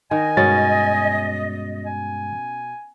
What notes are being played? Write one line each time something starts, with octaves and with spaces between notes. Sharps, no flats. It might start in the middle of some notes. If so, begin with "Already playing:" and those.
D#3 D#5 G#5
G2 B2 G#3 C#4 C#5 A6
G#5